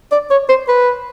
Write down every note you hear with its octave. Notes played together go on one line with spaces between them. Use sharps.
D5
C#5
C5
B4